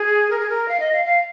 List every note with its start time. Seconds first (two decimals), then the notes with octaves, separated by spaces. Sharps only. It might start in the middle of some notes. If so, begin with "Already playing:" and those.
Already playing: G#4
0.30 A#4
0.40 G#4
0.50 A#4
0.68 F5
0.80 D#5
0.92 F5
1.05 F5